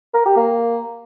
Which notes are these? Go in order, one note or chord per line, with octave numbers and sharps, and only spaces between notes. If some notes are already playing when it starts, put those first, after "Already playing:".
A#4
G4
A#3